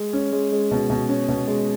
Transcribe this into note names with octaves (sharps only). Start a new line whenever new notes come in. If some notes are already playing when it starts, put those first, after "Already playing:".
Already playing: G#3
C#4
G#3
G#3
B2
B2
C#4
B2
G#3